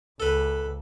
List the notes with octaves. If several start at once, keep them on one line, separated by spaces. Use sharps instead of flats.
C#2 A4 B4